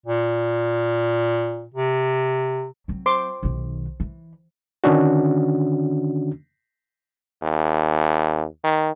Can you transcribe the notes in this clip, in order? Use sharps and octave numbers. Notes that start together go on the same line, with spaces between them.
A#2
C3
F#3 C4
C5 C6 D6
B1 D#3
E3
D3 D#3 C#4 D4 F#4
D#2
D#3